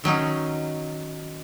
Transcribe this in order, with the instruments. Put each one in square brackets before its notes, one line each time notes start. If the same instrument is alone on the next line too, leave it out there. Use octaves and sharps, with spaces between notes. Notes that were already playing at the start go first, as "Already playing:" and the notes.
[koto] D#3 F#3 C#4 D#4